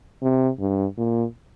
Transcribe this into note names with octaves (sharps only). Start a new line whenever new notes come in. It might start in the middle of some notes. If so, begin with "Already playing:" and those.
C3
G2
A#2